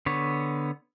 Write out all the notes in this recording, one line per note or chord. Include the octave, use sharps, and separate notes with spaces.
D3 B3 C#5